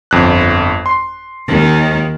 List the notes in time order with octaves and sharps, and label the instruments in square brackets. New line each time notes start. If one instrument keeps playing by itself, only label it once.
[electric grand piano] G1 F2 F#6
C6
[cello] D#2 D#3